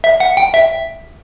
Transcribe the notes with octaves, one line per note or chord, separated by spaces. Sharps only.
E5
F#5
G5
E5